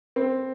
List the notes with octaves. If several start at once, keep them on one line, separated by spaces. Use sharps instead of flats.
C4